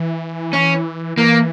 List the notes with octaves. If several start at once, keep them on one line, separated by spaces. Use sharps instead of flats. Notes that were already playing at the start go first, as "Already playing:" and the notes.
Already playing: E3
C#4
E3 A#3